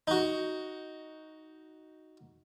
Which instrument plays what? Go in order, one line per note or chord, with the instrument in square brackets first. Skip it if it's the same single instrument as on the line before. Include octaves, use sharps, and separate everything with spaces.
[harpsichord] D#4 F#4